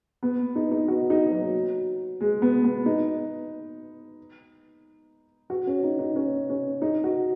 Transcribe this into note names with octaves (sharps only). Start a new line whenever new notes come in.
B3
D#4
D#4
F#4
D#4
F#3
G#3
B3
B3
D#4
F#4
C#4
D#4
D#4
C#4
C#4
D#4
F#4